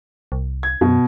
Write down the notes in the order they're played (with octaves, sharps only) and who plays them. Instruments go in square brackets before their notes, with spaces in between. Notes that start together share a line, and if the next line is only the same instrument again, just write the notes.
[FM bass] C2
[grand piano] G#6
[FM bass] F#2 [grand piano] B2